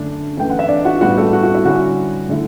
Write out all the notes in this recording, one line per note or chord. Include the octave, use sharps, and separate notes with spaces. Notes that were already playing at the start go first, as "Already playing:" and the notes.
Already playing: F#2 D3 A3 D4
F#2 E3 A3 E4 G5
F#5
E5
D4 D5
F#4 F#5
A2 G3 B3 F#4 F#5
A3 A4
F#4
F#4
E4
D3 G3 C#4 E4 F#4
D3 A3 E4